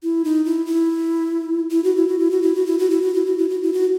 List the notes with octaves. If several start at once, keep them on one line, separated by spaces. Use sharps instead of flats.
E4
D#4
E4
E4
E4
F#4
E4
F#4
E4
F#4
E4
F#4
E4
F#4
E4
F#4
E4
F#4
E4
F#4
E4
F#4